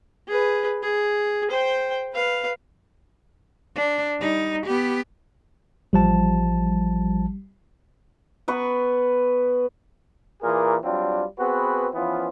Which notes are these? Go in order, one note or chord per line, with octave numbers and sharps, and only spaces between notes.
G#4 B4
G#4
C5 G5
B4 F5
D4
G3 D#4
B3 G4
A1 F3 G3 A5
B3 B4 C#6
A#2 E3 G#4 A#4
F#3 G3 C4 D4 F4
B3 C4 F#4 G#4 B4
E3 F3 B3 C#4 F4